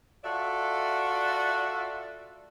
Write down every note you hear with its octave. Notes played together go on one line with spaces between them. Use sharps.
F4 F#4 A4 D5 E5